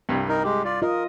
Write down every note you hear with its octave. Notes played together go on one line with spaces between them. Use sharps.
C2 G2
D#4 A#4
G#3 G4
F4 D5
F4 A#4 D#5